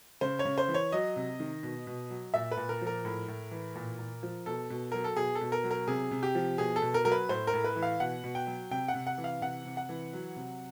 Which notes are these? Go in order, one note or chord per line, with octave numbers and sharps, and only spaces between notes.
C#3 C5
C#5
C#3
C5
E3
C#5
F#3 D#5
C3
D#3
B2
B2
F#3
A#2 E5
B4
A#2
A#4
F3
A#4
A2
A2
E3
A#2
A#2
F3
B2 A4
B2
F#3 A#4
A4
B2 G#4
A4
B2
A#4
F#3
A#4
C3 G#4
C3
G4
F3
B2 G#4
A4
B2
A#4
F#3 A#4
B4
A2 C5
A#4
A2
B4
E3
F5
B2 F#5
B2
G5
F#3
C3 G5
F#5
C3
F#5
E3
F5
C3 F#5
C3
F#5
E3
F#3
C3